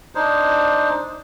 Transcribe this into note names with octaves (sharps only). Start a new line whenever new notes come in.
D4 D#4 C5